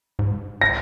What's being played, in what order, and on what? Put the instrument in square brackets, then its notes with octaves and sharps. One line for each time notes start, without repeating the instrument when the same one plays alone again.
[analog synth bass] G#2
[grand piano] A#6